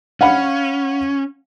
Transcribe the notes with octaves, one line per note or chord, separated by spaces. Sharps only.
C#4 F5 F#5 B5